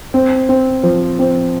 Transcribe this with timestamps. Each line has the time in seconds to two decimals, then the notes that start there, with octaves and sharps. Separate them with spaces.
0.14 C4
0.49 C4
0.83 F3
1.19 C4